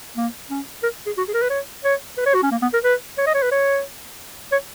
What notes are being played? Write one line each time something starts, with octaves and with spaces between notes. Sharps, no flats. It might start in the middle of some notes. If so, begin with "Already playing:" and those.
A#3
C#4
A#4
G#4
F#4
G#4
A#4
B4
C#5
C#5
B4
C#5
F#4
C#4
A#3
B3
A#4
B4
C#5
D#5
C#5
B4
C#5
C#5